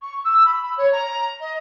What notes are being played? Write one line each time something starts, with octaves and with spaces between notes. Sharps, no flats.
C#6
E6
B5
B5
C#5
A#5
D#5